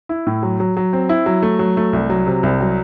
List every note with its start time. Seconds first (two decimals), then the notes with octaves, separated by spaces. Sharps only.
0.09 E4
0.27 A2
0.43 F#3
0.60 F#3
0.77 F#3
0.93 C4
1.09 E4
1.26 F#3
1.42 A3
1.59 F#3
1.77 A3
1.93 C2
2.10 F#3
2.27 C3
2.43 C2
2.60 F#3